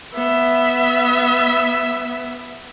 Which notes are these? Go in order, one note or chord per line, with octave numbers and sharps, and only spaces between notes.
B3 E5